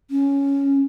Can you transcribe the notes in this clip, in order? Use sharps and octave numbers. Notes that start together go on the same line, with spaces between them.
C#4